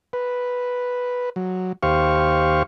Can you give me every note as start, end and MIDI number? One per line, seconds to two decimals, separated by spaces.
0.13 1.30 71
1.36 1.72 54
1.83 2.63 39
1.83 2.63 67
1.83 2.63 72
1.83 2.63 77
1.83 2.63 85